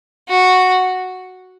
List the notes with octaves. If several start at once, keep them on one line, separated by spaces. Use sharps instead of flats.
F#4